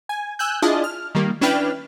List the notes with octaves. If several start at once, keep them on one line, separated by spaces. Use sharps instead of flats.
G#5
G#5 E6 F#6 G6
D4 E4 F4 G#4 D#5 A5
F6
D#3 G3 A#3
C#4 D4 E4 B4 G5 F6